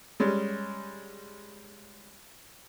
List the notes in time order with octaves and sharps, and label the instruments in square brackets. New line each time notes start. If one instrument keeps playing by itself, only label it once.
[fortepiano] G3 G#3 C#4